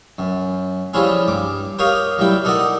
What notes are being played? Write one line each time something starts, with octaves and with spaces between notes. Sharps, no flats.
F#2
F3 G3 C#4 E4 F4 G#4
G2 D6
G4 A#4 C#5 D#5 F5
F#3 G3 E4 G5
D#4 A4 A#4 D5 D#5 F#5